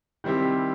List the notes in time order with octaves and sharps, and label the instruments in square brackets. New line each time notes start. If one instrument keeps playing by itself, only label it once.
[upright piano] D#3 G3 C4 E4 G4